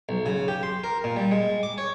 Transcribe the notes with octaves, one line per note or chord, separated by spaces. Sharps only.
B1
C#3
G4
C6
A#4
A#2
G3
G#3
D6
C#5